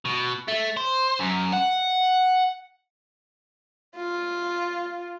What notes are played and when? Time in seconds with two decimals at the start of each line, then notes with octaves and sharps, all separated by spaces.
0.06 B2
0.48 A3
0.77 C5
1.20 F#2
1.53 F#5
3.96 F4